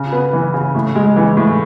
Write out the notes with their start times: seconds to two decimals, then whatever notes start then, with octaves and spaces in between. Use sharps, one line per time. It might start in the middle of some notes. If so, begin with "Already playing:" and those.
Already playing: C#3
0.12 B3
0.33 E3
0.54 C#3
0.75 A2
0.95 G#3
1.16 E3
1.37 A2